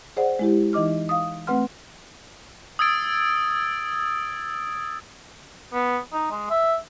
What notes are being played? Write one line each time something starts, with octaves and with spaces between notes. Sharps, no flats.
G#4 C5 D5 F#5
G#3 E4 G4
E3 D#4 D#5 D6 F6
F5 D#6
A3 C4 B4 F#5 C6 F6
D#6 E6 G#6 A6 D7
B3
D#4
G#3
E5